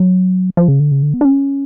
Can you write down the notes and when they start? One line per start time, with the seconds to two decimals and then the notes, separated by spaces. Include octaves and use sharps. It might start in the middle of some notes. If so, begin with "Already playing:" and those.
Already playing: F#3
0.57 F3
0.68 C#3
0.80 D3
0.91 C#3
1.02 D3
1.14 B3
1.21 D4
1.25 C#4